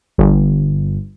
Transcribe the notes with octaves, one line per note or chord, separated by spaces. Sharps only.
G1